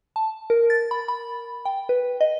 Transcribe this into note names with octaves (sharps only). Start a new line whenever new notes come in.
A5
A#4
A6
B5
B5
G5
B4
D#5